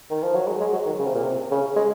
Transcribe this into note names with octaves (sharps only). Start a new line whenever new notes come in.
D#3
F3
F#3
G#3
G#3
F#3
D#3
C#3
C3
A#2
C3
C#3
G#3